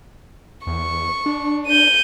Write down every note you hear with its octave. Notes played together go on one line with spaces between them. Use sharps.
E2 C#6
D4
G6 D#7